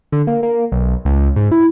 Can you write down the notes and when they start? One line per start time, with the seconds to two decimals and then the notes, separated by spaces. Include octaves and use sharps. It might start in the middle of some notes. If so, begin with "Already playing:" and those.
0.12 D3
0.27 A#3
0.43 A#3
0.72 B1
1.05 C#2
1.36 G#2
1.52 E4